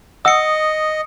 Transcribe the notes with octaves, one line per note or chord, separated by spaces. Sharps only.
D#5 F#5 D#6 E6 C#7